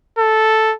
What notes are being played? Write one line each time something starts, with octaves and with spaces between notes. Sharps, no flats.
A4